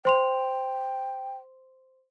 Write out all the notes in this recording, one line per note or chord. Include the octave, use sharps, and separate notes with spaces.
C5 G5 C6 F7